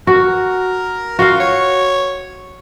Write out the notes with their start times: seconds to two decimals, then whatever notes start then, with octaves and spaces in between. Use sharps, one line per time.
0.07 F#4 A#4
1.19 F4 F#4 F5
1.40 C#5